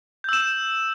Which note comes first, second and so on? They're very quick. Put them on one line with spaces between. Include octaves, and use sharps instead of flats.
G6 E6 E7